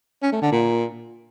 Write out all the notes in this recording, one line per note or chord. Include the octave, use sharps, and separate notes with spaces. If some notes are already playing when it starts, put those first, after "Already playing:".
C#4
A3
D3
A#2